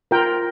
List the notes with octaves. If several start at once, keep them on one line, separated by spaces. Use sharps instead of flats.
F4 A#4 G5